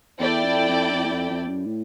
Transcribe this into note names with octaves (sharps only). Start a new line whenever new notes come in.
E2 E4 A4 D5 G5
F2
F2
F#2
F2
E2
F2
F2
F#2
A2